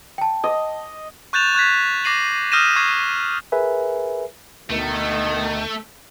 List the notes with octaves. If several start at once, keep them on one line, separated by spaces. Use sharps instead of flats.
G5 A5
D#5
C#6 F#6 G6 A6 E7 F7
C#6 F#6 G#6 B6
D6 A#6 C7 D#7 F#7
D#6 F6 G6 A#6 D#7 E7
C#6 G#6 C7 F7
G#4 A#4 B4 E5 G#5
D2 B2 D#3 A3